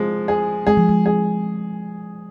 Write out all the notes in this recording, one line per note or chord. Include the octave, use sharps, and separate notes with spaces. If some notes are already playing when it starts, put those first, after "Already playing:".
Already playing: F3 G#3
G#4
G#3 G#4
F3
G#3
G#4